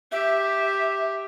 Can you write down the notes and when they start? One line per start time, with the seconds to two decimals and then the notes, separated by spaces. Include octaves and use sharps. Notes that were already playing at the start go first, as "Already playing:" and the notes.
0.12 G4 E5